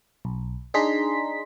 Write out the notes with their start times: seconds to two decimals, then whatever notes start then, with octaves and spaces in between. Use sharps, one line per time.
0.25 B1
0.74 D4 D#4 G#4 A#5 C6 B6